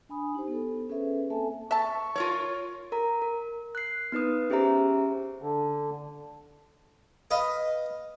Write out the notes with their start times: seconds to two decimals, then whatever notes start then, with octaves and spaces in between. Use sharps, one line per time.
0.09 D4 G#5 B5 D#6
0.35 D#4 G4 C5
0.48 B3 A4
0.89 C#4 G#4 A4 B4 C5 E5
1.30 A#3 C4 A4 E5 G#5 A5
1.71 E5 A5 C#6
2.16 F4 A#4 C#5
2.92 A#4 A#5
3.22 A#4
3.75 F#6 C7
4.12 B3 D#4 B4 D#6
4.50 C#4 G4 G#4 C5 E5 A#5
5.42 D3
7.31 B4 D#5 F5